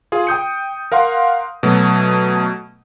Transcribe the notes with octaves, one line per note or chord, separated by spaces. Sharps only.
F4 G#4
G5 D#6 G6 C#7
A#4 F5 F#5 C6
B2 F#3 A3